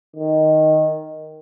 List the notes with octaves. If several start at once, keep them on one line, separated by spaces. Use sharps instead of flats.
D#3